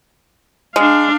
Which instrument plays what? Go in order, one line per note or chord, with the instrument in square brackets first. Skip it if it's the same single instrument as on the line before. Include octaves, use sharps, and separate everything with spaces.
[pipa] G#3 [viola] D4 F5